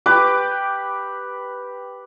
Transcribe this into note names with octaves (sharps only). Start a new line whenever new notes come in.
G4 B4 D6